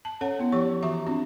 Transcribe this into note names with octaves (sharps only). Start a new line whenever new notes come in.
A5
C#4 A4 C#5 F#5
B3 E4
F3 G4 C#5 C#6
E3 F#4 E5 A#5 C#6
C4 D4 F4 F#4